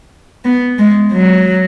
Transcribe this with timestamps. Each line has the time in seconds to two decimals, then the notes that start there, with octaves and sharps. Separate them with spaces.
0.45 B3
0.79 G#3
1.13 F#3